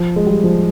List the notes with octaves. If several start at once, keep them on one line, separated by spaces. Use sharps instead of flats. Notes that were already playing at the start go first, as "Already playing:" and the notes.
Already playing: F3
G#3
G3
F3